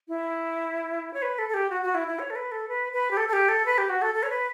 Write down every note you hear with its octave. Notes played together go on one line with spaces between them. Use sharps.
E4
C#5
B4
A4
A4
G4
F#4
F#4
E4
E4
C#5
A4
B4
A4
B4
B4
G4
A4
A4
G4
A4
B4
G4
F#4
A4
A4
C#5
B4